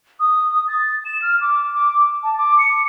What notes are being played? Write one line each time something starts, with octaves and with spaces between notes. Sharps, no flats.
D#6
A6
E7
F6
D6
D6
A5
D6
C#7